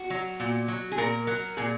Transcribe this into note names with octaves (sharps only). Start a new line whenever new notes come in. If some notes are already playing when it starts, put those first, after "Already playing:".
Already playing: F#4
F#3
A#2
F#3
G#4
A#2 A#4
F#3 A#4
A#2 G#4